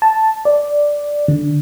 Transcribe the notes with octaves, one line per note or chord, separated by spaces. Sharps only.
A5
D5
D3